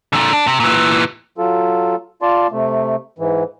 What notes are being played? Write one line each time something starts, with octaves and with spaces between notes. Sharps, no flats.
A#2 D3
D4
C3
A#2 E3
F#3 F4 A4
F4 D5 A5 C6
C3 A3
G#2 E3